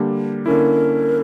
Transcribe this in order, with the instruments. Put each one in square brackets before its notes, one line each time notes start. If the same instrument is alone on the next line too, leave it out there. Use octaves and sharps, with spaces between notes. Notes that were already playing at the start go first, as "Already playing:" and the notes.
Already playing: [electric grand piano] D3 G3 A#3 D4 G4
[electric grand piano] D3 A#3 C#4 E4 [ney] A#4